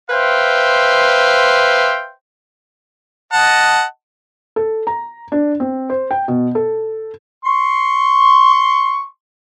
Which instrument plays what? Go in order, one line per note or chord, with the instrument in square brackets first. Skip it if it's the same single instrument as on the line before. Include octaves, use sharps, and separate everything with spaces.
[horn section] B4 C5 E5 F5 G5 C6
[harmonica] D#5 F#5 A5
[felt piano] A4
A#5
D4
C4
C5
G5
B2
A4
[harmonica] C6 C#6